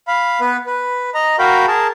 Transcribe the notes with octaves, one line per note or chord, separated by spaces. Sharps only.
F5 B5
B3 B4
B4
D#5 A#5
F#4 A#4 F5 G5 B5
G#4 A#4 A5